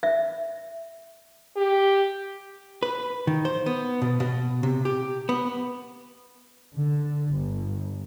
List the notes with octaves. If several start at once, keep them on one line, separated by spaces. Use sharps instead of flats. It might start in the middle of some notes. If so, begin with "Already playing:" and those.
E5
G4
B4
D#3
C5
B3
B2
B2
C3
G4
B3
D3
G1